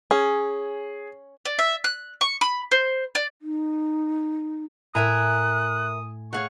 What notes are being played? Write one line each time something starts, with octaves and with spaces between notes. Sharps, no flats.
C#4 G#4
D5
E5
F#6
C#6
B5
C5
D5
D#4
A2 A#4 E5 G#5 A#5 D#6 F#6 D#7
A3 G#4 C#5 F5 F#5 C#6